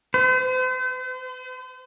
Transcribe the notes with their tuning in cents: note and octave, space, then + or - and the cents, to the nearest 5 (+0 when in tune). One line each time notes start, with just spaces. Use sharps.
C5 -40